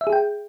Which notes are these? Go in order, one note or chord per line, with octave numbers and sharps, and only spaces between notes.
E5
G#4
G5